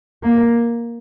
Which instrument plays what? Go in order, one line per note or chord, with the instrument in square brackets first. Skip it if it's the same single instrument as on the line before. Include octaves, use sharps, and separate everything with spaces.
[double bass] A#3